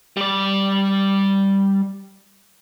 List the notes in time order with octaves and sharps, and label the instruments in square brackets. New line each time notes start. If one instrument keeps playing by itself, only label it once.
[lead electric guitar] G3 D5